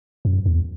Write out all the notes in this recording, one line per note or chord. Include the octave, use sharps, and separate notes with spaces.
F#2
E2